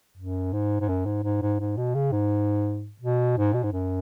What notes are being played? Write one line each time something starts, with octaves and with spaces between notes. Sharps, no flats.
F#2
G#2
G#2
F#2
G#2
G#2
G#2
G#2
B2
C#3
G#2
B2
G#2
B2
G#2
F#2